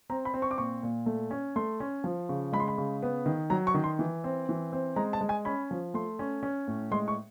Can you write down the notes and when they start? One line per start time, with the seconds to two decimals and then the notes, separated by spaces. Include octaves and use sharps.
0.10 C4 A#5
0.25 B5
0.34 C4
0.42 C#6
0.51 D6
0.58 A#2 C#6
0.83 A#2
1.06 A3
1.31 C#4
1.56 A3 C6
1.80 C#4
2.04 F3
2.29 C#3
2.53 G#3 B5
2.60 C6
2.68 B5
2.78 C#3
3.02 B3
3.26 D#3
3.50 F#3 A#5
3.67 C#6
3.74 D#3
3.84 C6
3.99 E3
4.24 C4
4.49 E3
4.73 C4
4.96 G#3 A#5
5.13 A5
5.21 G#3
5.29 G#5
5.45 C#4 B5
5.71 F3
5.94 A3 C6
6.19 C#4
6.43 C#4
6.67 A2
6.91 G#3 C6
7.08 C#6